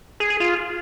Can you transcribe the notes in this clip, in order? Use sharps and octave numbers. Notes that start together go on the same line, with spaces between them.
G#4
G#4
F4